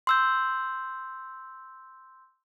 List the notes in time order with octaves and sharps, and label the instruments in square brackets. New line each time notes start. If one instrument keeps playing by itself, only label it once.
[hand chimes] C6 E6 G6